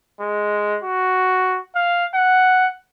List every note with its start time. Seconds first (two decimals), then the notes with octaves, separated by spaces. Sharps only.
0.21 G#3
0.84 F#4
1.75 F5
2.15 F#5